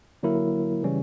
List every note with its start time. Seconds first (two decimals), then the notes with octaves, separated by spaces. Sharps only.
0.23 D3 F#3 A#3 E4 A#4
0.83 C#3 E3 G3 C#4